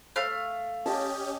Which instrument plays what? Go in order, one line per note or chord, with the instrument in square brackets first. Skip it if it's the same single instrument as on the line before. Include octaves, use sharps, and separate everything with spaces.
[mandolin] A3 F5 F6
[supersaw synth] C#4 G4 [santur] D#5 A5